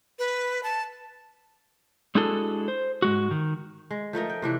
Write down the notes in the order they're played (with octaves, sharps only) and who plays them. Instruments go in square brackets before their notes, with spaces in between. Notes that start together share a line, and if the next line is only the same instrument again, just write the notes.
[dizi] B4
A5
[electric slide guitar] G#3 D4 E4 F#4 G#4 A4
C5
G#2 G#3 F#4
D#3
[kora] G#3
F3 A3 D#4 A#4
G5
C3 E3 D4